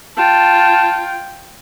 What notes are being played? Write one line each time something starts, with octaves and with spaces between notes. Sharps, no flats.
F4 G5 A5